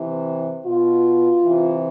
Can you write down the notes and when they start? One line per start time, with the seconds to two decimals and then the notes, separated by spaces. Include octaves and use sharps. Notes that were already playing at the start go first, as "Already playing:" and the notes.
Already playing: C3 E3
0.65 B2 F4
1.44 C3 E3